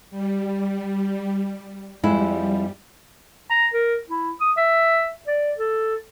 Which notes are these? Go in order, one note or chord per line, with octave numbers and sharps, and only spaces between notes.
G3
F2 G3 G#3 E4
A#5
A#4
E4
D#6
E5
D5
A4